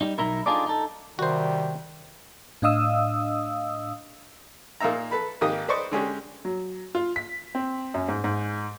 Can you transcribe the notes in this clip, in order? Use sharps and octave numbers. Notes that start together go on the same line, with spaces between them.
G3 D#4
B1 D#4 E4 A#4
D4 D#4 F4 G#4 A4 D5
D#4 A4
C3 D#3 G3 F#4 C5
A2 D4 D#5 F5 D#6 E6
A#2 A#3 D#4 E5 A#5
A4 B4 B5
G#1 D#3 A#3 G4 D#6
B4 C5 D5 D#5 C#6 D6
D3 G#3 C#4 G4
F#3
F4
B6
C4
F#2
G#2
G#2